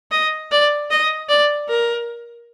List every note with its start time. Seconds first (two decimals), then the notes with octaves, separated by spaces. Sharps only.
0.11 D#5
0.51 D5
0.91 D#5
1.29 D5
1.68 A#4